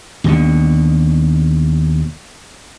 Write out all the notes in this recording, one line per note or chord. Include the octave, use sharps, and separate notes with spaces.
D#2 B2 D3